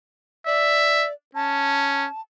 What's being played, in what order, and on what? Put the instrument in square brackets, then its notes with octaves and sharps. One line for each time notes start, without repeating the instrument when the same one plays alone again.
[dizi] D5 [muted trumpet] E5
[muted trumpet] C#4 [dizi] A5